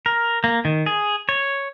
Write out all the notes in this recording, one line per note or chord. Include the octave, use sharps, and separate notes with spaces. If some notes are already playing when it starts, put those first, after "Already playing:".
A#4
A#3
D#3
G#4
C#5